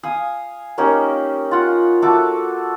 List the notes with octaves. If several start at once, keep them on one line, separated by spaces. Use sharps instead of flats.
F5 G#5 D#6
A#3 C#4 D#4 G4
F4 F#5
A3 F#4 A4 D6